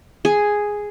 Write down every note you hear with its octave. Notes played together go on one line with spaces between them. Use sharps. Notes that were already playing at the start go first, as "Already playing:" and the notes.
G#4